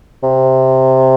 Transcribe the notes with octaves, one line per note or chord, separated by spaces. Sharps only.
C3